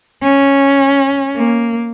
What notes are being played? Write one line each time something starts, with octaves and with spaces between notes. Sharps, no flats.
C#4
A#3